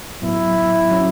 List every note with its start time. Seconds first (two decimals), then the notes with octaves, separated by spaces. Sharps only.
0.22 A2 F#3 B3 E4
0.91 F#3 C#4 F#4